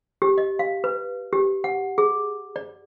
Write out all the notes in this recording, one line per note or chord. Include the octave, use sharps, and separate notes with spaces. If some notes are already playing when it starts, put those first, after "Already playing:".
G4
D#5
F5
B4
G4
F#5
G#4
D5